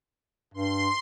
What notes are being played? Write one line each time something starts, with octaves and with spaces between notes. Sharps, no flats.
G2 C6